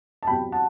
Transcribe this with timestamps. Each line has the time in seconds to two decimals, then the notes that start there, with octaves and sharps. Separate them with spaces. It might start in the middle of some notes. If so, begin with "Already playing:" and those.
0.23 A5
0.27 E2 C3 F#3 G5 B5
0.52 F#5 A5